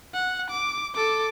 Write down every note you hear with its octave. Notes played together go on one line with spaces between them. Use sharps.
F#5
D6
A4 D6